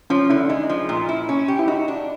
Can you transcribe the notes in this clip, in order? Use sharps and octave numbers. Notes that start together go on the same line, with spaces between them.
F3 C#4
D3 E4
G#3 D#4
F3
A#2
E4
C#4
G4
E4
D#4 F#4
D4